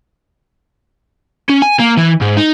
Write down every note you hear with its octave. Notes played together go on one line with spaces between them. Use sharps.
C#4
G#5
A#3
E3
G#2
D#4